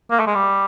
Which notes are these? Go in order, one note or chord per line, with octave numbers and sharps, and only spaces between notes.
A#3
A3
G#3
G3